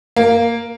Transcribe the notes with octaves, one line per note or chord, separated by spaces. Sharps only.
A#3